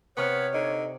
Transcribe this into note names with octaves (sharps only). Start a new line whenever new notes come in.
C3 B3 C#5 C#6 F6
D3 D#4